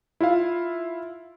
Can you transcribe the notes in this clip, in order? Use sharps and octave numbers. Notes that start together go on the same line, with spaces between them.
E4 F4 E5 F5